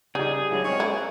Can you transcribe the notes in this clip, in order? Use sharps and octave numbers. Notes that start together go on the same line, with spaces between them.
C#3 G3 D#4 G#4
F#3 G#3 D4 E4
G#3 C4 C#4 C#5
E4 A4
A#3 G#5 F#6